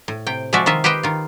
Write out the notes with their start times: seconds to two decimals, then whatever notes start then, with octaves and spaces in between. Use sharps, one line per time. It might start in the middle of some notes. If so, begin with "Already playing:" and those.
0.08 A2
0.27 C3 G5
0.53 F3 G#3 F4 F#4 D5 E5
0.66 D#3 F4 D#5 E5
0.84 G4 B4 C5 D#5 G5
1.03 D#3 F4